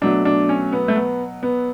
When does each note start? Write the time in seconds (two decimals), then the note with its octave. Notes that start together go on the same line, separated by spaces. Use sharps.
0.02 B2 F#3 A3 D4
0.25 D4
0.49 C#4
0.72 B3
0.88 A3
0.96 B3
1.43 B3